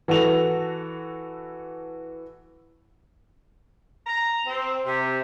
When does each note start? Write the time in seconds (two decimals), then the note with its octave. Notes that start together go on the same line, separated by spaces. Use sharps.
0.08 E3 F#4 A4 F7
4.07 A#5
4.47 C4
4.86 C3